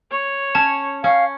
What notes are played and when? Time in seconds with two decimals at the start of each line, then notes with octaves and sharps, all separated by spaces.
0.11 C#5
0.55 C#4 A5
1.04 C#4 F5